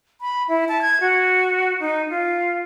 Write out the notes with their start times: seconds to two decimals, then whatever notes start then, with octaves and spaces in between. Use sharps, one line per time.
0.21 B5
0.49 E4
0.69 A5
0.82 G#6
1.01 F#4
1.80 D#4
2.10 F4